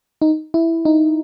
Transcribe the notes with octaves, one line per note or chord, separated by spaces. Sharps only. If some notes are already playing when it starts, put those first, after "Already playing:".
D#4
E4
D#4